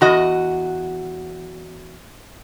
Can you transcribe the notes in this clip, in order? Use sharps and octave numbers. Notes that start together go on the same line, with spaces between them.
E2 F#4 D#5